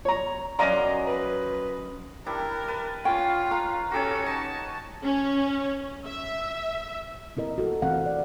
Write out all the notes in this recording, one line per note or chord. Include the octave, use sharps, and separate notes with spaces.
C#5 A#5
F#2 D5 D#5 F5 A#5 C6
B4
G3 D4 E4 A#4
B4 A5
C#4 F4 F5 G5
F5 A#5
C#4 F#4 G4 A4 C#5
D#4 G#5 A5
C#4
E5
C4 E4 A#4 D#5
F#4 A4
E3 C4 F5 F#5
D5